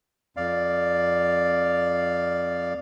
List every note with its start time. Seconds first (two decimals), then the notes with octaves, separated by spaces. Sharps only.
0.37 F2 D5 F5